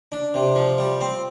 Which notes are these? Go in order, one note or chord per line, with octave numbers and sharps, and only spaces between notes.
D4
C3
F3
G3
C4